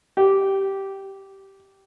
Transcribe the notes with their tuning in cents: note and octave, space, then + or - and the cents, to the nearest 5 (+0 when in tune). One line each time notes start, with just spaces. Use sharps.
G4 -10